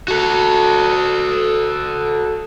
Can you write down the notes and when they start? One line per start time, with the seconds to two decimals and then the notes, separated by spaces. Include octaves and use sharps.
0.08 F#4 A4